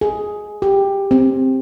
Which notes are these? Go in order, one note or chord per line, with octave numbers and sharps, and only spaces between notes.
G#4
G4
C4